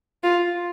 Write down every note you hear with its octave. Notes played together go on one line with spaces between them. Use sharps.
F4